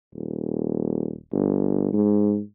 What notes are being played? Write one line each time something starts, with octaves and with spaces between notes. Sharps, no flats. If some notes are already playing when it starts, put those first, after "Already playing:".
D#1
G1
G#2